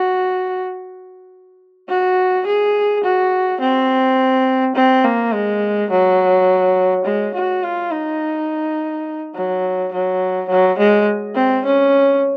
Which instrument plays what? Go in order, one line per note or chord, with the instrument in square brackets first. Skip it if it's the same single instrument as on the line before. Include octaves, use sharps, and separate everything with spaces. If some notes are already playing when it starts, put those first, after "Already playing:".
Already playing: [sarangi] F#4
F#4
G#4
F#4
C4
C4
A#3
G#3
F#3
G#3
F#4
F4
D#4
F#3
F#3
F#3
G#3
C4
C#4